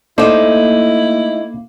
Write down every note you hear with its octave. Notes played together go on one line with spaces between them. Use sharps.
A3 A#3 D#4 E4 A4 C5 D5